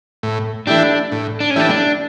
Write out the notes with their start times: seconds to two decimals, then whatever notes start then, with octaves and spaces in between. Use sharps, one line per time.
0.23 A2
0.67 E3 A3 D4 E4 G4
1.12 A2
1.40 D4
1.51 C#4
1.56 E3 A3 D4 E4 G4
1.70 D4